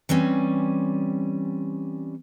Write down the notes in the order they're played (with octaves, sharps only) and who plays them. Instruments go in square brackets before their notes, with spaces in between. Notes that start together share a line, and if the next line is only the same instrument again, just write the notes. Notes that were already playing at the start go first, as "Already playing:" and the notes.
[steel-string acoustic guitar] E3 G3 C4 C#4